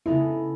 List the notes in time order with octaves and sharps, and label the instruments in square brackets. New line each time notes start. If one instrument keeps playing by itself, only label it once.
[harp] C#3 G#3 B3 D#4 A4 [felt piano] E4